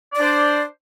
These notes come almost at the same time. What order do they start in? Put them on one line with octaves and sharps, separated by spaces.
D5 D4 C5